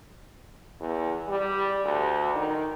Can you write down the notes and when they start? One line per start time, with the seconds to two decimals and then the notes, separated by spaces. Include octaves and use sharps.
0.80 E2
1.28 G3
1.85 D2
2.35 D#3